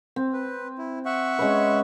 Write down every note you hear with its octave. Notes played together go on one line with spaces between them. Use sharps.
C4
B4
E4
E5 F#5 C#6
G#3 C#4 B4